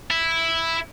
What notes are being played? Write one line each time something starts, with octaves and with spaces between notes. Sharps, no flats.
E4